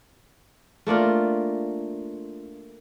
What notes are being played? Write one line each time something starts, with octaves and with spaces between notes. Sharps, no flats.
A3 A#3 D4 F4